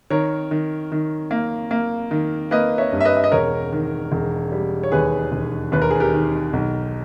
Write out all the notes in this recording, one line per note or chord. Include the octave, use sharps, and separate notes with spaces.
D#3 A#4 C#5
D#3
D#3
A#3
A#3
D#3
A#3 B4 D#5
C#5 E5
G2
E5
B4 D#5
E5
D#5
E1 A#4 C#5
D#3
E1
G3
C#5
D#2 G#4 B4
E1
D#2 B4
A#4
G#4
G4 A#4
D#3
B1